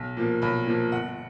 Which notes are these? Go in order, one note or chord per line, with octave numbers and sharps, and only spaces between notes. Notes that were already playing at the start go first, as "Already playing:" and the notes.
Already playing: B1
A#2 F3 A#3
B1 B5
A#2 F3 A#3
G1 F#5